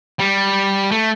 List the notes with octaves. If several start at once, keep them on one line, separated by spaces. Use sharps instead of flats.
G3
A3